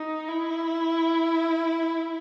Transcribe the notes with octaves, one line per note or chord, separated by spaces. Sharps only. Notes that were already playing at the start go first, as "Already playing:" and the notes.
Already playing: D#4
E4